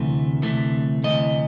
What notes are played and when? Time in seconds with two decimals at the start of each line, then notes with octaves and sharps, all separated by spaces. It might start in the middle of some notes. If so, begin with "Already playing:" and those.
Already playing: D2 C3 E3 A3
0.42 D2 C3 E3 A3
1.04 D2 C3 E3 A3 D#5